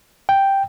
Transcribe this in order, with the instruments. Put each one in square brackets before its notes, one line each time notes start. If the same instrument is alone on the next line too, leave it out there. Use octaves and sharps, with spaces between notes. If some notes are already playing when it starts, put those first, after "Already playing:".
[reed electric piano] G5